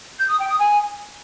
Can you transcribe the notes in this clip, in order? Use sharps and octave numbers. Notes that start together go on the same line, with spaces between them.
G6
D#6
G5
D#6
G#5